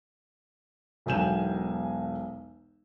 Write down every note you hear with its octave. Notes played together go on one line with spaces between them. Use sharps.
E1 B1 F#3 G#5 G6 E7